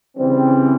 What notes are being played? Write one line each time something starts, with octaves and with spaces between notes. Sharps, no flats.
C#3 E3 G3 C4